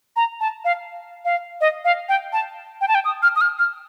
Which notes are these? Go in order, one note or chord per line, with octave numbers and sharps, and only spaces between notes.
A#5
A5
F5
F5
D#5
F5
G5
A5
G5
A5
G5
D#6
F6
D#6
F6
F6